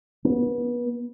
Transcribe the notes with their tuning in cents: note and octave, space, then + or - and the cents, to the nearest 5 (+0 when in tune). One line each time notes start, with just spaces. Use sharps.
B3 -30